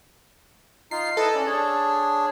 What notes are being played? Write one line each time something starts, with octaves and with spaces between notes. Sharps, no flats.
D#4 F4 C7
E4 A4 B4 D#5
C#4 D5
D4 G#4 C#5